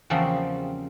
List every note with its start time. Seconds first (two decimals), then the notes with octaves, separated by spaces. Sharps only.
0.10 E2 C#3 F3 G3 A#3 C4